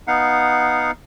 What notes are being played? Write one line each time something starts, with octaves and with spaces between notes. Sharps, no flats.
B3 D#4 F5 F#5